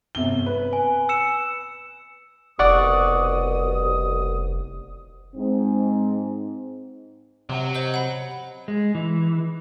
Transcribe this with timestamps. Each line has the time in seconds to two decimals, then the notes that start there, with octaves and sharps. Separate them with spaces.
0.15 G1 C3 G7
0.46 B4
0.73 G#5
1.09 E6 C#7 E7
2.59 F1 C2 B2 D5 F#5 C#6 D#6
5.35 G#2 C4
7.49 C3 F#3
7.75 C5 D#5
7.94 F#5 B5
8.68 G#3
8.95 E3